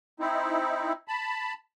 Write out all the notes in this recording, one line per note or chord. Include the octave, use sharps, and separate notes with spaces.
C4 D#4 E4
A5 B5